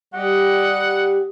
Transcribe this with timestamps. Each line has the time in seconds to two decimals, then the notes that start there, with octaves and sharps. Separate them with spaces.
0.14 G3 G4 D#5 F#5